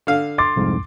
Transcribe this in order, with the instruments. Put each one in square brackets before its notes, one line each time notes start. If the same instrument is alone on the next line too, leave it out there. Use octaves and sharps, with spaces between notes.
[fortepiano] D3 F5
[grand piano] C6 D6 A6
[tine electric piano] C2 F2 G#2